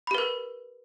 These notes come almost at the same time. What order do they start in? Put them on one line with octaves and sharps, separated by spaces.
B5 G4 B4 A#4